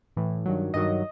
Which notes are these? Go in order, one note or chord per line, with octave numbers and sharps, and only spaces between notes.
A2 E3
G2 D#3 F#3
G2 D#3 F#3 D#5